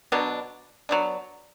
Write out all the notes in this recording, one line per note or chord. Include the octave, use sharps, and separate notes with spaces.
B2 F#3 B3 D4
F#3 B3 D4